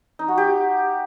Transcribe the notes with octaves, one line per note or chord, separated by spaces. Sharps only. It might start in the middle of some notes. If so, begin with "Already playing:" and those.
D#4
F#4
G4